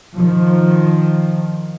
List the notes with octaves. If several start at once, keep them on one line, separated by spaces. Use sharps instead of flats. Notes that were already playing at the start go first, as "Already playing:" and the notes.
D#3 F3